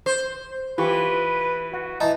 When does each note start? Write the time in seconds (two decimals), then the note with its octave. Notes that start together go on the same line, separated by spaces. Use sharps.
0.06 C5
0.78 E3 F4 G4 B4 C#6
1.74 F#4 F#5
2.00 E3 D#4 A5